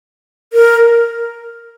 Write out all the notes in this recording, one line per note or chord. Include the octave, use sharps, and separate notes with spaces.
A#4